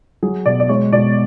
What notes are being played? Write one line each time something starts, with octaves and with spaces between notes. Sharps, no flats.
F#3 G#4
B2 D5
D5
G#3 C#5
B2 D5